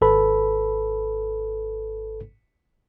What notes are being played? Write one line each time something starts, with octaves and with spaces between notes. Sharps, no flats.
G#1 A4 B4 B5